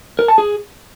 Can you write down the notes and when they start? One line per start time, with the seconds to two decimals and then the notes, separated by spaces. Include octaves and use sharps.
0.19 A#4
0.28 A5
0.38 G#4